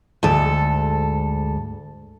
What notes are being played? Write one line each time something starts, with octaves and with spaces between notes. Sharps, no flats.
D2 G#2 A4